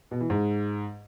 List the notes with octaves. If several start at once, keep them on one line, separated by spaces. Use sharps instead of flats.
B2
E3
G#2